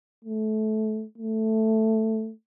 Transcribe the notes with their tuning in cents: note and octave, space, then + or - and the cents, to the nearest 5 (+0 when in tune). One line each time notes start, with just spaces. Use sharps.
A3 -20
A3 +5